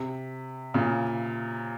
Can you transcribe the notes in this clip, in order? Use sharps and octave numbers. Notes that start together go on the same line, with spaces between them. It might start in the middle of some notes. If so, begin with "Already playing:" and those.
Already playing: C3
A#2 C#3